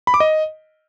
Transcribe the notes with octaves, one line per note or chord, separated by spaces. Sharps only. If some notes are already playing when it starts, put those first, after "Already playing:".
B5
D6
D#5